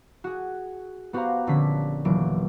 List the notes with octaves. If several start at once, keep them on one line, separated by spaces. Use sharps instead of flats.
F#4 G#4
B3 F#4 G4 C5 F5 A#5
A#1 D3 C#4 G4 B6
D#1 E3 F#3 A#3 D7